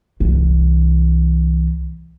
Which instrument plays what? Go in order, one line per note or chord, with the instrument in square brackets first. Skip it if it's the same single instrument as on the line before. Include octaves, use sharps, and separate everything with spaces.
[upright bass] C2 E3